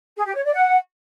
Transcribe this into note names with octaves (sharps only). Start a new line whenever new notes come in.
G#4
G4
C#5
D5
F#5